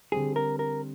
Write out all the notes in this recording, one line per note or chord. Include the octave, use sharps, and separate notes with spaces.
D3 G3 C4 G#4
A#4
A#4